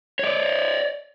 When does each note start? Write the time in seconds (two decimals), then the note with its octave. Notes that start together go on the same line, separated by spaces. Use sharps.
0.19 C#5 D5